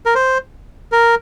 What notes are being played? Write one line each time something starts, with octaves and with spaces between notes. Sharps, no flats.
A#4
C5
A#4